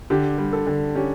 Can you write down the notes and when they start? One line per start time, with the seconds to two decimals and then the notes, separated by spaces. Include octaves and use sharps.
0.10 D3 G4
0.38 G3
0.53 A4
0.67 D3
0.95 C#4 G4